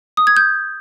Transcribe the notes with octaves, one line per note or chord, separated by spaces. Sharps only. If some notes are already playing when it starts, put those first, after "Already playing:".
D#6
G#6
G6